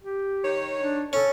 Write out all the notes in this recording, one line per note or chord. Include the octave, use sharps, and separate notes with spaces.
G4
D#3 C#5
D4
C#4 A4